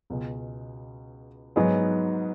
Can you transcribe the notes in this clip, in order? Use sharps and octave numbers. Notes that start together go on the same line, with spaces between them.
C#2 B2 G#3
G#2 F#3 B3 D#4 G#4